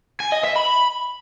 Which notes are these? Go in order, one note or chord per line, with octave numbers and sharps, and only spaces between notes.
G#5
D#5
E5
B5